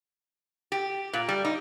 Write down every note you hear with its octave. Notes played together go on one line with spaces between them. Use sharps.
G4
A#2
G3
D#4